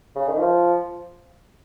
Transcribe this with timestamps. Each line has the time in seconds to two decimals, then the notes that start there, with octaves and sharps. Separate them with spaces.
0.16 C#3
0.28 D#3
0.39 F3